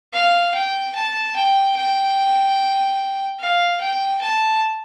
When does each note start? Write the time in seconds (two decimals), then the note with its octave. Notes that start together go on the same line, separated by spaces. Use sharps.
0.13 F5
0.54 G5
0.95 A5
1.36 G5
1.77 G5
3.39 F5
3.81 G5
4.21 A5